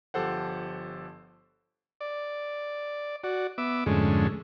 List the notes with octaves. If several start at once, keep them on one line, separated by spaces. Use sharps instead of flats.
G1 F3 G4 A4 C5 F#5
D5
F#4 D5
B3 E5 D6
F2 G#2 D3 G#3 A3 C#4